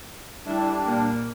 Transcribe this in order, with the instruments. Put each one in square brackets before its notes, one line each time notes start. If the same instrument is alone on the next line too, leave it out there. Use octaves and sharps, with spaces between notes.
[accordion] G3 D4 [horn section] A3 E4
[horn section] A#2 A#3